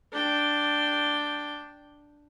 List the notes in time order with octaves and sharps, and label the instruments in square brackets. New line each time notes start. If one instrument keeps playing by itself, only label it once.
[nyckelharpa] D4 G5